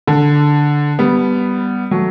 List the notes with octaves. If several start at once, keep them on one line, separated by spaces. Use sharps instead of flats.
D3
G3 B3
F#3 A3